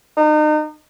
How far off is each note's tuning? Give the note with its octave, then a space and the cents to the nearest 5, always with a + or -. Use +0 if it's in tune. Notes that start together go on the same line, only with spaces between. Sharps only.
D#4 -35